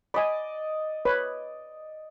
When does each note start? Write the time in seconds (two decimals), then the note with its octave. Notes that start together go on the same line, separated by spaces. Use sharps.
0.14 D5 D#5 G#5 B5
1.05 B4 C#5